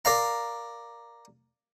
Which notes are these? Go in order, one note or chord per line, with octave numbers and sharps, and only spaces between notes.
A#4 D5 F5 A#5